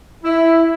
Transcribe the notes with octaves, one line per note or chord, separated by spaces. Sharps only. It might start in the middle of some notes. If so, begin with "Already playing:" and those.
E4